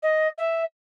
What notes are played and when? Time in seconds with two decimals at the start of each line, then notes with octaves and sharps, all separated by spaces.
0.02 D#5
0.37 E5